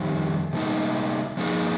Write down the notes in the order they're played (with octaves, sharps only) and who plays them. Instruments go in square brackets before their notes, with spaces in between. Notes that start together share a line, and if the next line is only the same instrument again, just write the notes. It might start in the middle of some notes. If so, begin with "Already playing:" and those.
Already playing: [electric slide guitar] F2 D#3 G3
C3 G3 A#3 D#4
F3 A#3 D#4 G#4